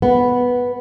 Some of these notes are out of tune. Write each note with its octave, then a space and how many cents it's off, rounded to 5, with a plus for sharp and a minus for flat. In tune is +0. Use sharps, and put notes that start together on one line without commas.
B3 -5